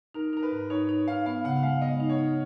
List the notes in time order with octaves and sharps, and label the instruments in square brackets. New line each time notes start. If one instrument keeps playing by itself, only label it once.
[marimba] D#4 [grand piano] A#4
[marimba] D#4 [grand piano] A#4
[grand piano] B4
[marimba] G#2
[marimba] D#4 [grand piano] C#5
[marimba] D#4
[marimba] D#4 [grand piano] F5
[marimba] B3 [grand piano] F5
[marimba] C#3 [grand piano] F#5
[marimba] G#3 [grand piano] F5
[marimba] B3 [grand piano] D#5
[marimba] D#4
[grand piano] C#5
[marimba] D#4